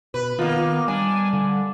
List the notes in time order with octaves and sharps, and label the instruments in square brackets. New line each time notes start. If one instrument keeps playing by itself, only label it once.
[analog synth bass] B2 [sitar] B4
[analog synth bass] D#3 [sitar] A#3 D#4 [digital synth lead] B3 [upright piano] F4
[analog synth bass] G3 [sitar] D4 [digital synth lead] G#5
[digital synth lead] D3